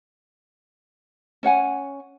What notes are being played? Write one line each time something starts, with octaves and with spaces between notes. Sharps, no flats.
C#4 C#5 F#5 G#5